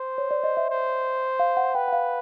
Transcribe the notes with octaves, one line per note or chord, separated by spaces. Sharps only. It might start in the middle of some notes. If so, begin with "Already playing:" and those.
Already playing: C5
C#5
D5
D#5
E5
C5
F5
F#5
B4 G5
F#5
F5